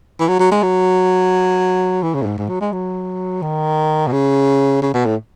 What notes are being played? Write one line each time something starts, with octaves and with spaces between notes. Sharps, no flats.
E3
F#3
F#3
G#3
F#3
E3
C#3
A2
G#2
G#2
F#3
G#3
F#3
D#3
B2
C#3
C#3
B2
A2